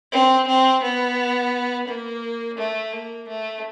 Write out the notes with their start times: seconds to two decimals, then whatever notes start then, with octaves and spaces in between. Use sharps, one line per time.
0.12 C4
0.47 C4
0.83 B3
1.88 A#3
2.57 A3
2.92 A#3
3.28 A3